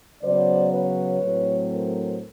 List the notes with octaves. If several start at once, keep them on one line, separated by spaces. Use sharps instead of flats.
C#3 F#3 B3 C5 D5
B4 C#5
A2 F#3 A3 C4
A#4 C5